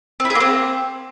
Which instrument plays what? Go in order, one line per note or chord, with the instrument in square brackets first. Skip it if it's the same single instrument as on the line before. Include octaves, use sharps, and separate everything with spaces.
[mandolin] C4
E4
G#4
A#3
C4